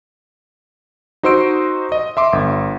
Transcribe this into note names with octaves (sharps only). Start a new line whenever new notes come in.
D#4 F#4 C5 C6 E6 D7
D#5
E5 C6 D6
G1